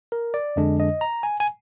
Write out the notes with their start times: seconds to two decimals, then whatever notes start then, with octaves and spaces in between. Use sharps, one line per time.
0.12 A#4
0.34 D5
0.56 F2 D3 G#3 D4 D#5
0.80 D#5
1.01 A#5
1.23 G#5
1.40 G#5